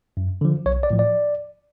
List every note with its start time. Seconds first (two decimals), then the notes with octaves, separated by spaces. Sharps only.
0.17 F#2
0.41 D3 F3
0.66 B1 C#5
0.83 D5
0.91 A2 F3
0.99 D5